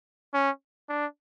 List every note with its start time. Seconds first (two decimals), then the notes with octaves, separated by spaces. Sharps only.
0.34 C#4
0.89 D4